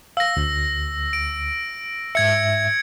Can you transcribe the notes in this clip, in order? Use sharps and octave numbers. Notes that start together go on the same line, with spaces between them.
F5 E6 A#6
D2
D7
G#2 E5 G#6 C#7